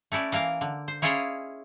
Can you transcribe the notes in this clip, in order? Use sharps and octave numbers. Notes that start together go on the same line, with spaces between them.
A3 C#4 E4 D5
E3 A#3 A#4 F5 A#5
D3
C5
C#4 E4 F4 G#4 C#5 D#5